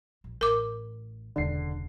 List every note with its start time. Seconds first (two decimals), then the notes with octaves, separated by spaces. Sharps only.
0.24 A#1
0.41 A1 A2 A#4 D6
1.36 E1 C#2 D3 C7